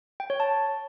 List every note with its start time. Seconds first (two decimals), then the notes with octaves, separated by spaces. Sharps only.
0.20 G5
0.30 C#5
0.40 A5